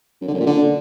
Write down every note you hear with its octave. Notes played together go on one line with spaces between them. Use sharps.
F#2
D3
F#2
A#2
D3